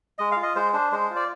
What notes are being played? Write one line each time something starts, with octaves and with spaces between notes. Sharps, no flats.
G#3 D#5
F4 F5
D#5
G#3 C5
D4 C5
G#3 C5
F4
D5